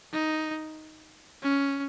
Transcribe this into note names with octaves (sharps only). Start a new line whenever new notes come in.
D#4
C#4